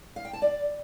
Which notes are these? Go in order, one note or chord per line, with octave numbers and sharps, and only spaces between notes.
F5
G5
A5
D5